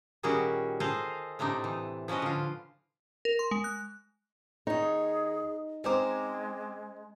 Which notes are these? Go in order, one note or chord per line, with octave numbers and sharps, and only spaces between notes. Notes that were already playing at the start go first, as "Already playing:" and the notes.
A#2 D#3 G3 C#4 F#4 G#4
G#4 A4 C5 D#5 F5
A2 C3 C4 D4 D#4
E3
F3 C#4 F#4 B4 D#5
D3 F4
A#4
C6
G#3
F#6
D#2 D#4 G#4 C#5
G#3 C4 C#4 C5 A#5 D6